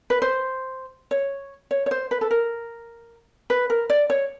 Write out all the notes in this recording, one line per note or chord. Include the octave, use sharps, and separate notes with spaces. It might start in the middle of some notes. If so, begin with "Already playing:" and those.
B4
C5
C#5
C#5
C#5
C5
B4
A4
A#4
B4
A#4
D5
C#5